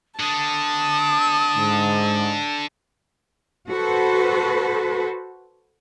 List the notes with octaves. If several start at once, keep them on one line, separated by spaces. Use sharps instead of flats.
D3 A5 D#6
G#2
F#4 A4 B4 C5